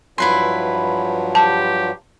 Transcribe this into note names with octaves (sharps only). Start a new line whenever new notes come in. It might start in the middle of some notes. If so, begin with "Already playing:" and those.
G2 F3 F#3 E4 B4 C6
G4 A5